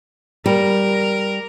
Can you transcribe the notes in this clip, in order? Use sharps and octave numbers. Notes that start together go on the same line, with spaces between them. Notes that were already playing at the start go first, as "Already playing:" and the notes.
G3 A#4